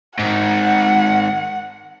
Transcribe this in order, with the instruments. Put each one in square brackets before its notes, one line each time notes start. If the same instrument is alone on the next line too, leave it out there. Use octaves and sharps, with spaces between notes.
[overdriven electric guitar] G#2 D#3 [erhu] F#5